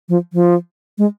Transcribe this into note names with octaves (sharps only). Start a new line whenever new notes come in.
F3
F3
G#3